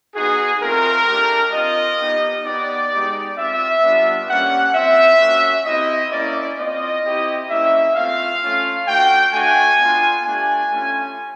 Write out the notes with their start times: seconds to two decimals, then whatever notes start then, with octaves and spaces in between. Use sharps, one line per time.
0.15 B3 D#4 F#4 G#4
0.61 A3 C4 F4 A#4
1.07 A3 D4 G4
1.53 C4 F4 D#5
2.00 B3 D#4 G4
2.45 B3 D#4 G4 D5
2.91 G#3 B3 D#4 G4
3.36 C4 F4 E5
3.82 G3 B3 D4 F4
4.29 G3 A#3 C#4 F#5
4.74 C4 F4 E5
5.20 A#3 C#4 F#4
5.65 C4 E4 G4 D#5
6.11 A#3 C#4 E4 D5
6.58 C4 F4 D#5
7.04 C4 E4 G4
7.49 A#3 C#4 E4 E5
7.95 A3 C4 F4 F5
8.42 A3 C#4 F4
8.87 A3 D4 F#4 G5
9.33 A3 D4 F#4 G#5
9.79 B3 D4 F4
10.25 A3 D4 G4 G#5
10.71 A3 C#4 F4